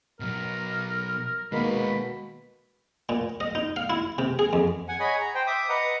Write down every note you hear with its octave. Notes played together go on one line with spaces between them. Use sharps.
B2 F#3 A#4
B2 D#3 G#3 A#3 B4 B5
A#2
D#5
D#4
F5
E4
C3
G#4
F2
F#5 G#5
G#4 C#5 D#5 F#5 G#5 B5
A#5
C5 G5
E5 D6 D#6
B4 D#5 F#5 A#5 D#6